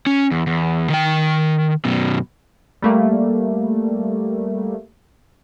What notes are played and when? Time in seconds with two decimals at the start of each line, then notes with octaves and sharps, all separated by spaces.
0.06 C#4
0.31 E2
0.47 E2
0.90 D#3 G5
1.85 F#2 B2
2.82 G3 A3 A#3